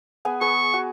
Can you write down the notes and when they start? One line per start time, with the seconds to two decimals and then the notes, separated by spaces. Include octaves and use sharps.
0.25 B3 G#4 G#5
0.41 G#4 B4 C#6
0.74 F#4